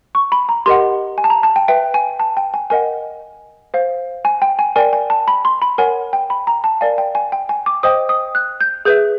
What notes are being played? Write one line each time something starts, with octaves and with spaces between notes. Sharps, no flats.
C#6
B5
A#5
G4 A#4 D#5 F#5 C6
G#5
A5
A#5
A5
G5
B4 E5 G5
G#5
A5
G5
G#5
A#4 D#5 F#5 G#5
C5 F5
G#5
G5
G#5
A#4 D5 G5 G#5
G#5
A5
B5
C6
B5
A#4 C#5 F#5 G#5
G5
B5
A#5
A5
A#4 D5 F5 G#5
G5
G#5
G5
G#5
D6
C5 D#5 G5 D#6
D#6
F#6
G6
G#4 B4 E5 G6